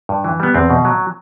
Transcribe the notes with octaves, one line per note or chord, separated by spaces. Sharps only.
G2
E3
G3 B3
E2 C4
B2
F#3